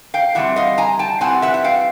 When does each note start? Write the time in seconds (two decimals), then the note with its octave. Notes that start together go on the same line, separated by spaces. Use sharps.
0.14 F5 G5
0.35 E3 G3 C4 E5 F#5
0.56 D#5 F5
0.78 G#5 A#5
0.99 G5 A5
1.21 E3 G3 C4 F#5 G#5
1.42 E5 F#5
1.54 F#5
1.64 F5 G5